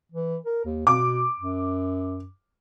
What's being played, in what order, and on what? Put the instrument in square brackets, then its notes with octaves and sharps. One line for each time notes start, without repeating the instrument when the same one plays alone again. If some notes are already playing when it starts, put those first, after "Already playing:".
[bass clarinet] E3
A#4
D#2
[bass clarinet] B2 [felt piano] D6
[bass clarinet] F#2